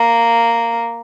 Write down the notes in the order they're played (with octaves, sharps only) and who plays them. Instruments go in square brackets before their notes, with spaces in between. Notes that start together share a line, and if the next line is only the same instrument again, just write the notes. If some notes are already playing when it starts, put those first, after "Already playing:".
Already playing: [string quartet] A#3